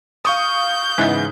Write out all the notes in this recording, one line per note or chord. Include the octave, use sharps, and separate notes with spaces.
F5 C#6 D#6 G6
G#2 C#3 E3 G#3 B3